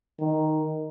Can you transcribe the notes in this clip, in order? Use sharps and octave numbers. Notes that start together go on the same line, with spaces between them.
D#3